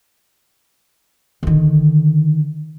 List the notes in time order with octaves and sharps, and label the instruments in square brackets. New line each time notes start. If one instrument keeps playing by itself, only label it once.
[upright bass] D3 D#3